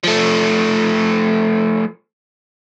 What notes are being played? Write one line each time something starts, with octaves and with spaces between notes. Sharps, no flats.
F3 A3